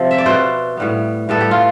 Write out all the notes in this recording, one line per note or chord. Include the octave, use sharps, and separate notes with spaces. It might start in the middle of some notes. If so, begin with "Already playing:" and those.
Already playing: C3 F3 C4
E5
D5
B2 B3 C5
A2 G3 B3
A2 G3 B3 A4
G4
F4